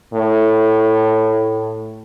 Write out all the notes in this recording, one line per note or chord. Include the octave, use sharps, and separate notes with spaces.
A2